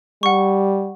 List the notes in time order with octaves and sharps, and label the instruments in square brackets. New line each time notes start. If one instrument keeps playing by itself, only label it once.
[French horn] G3 [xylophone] F#5 C#6